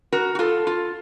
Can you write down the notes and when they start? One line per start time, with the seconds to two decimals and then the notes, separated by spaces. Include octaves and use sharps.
0.12 F#4 A#4
0.35 F#4
0.39 F4 A4
0.67 F4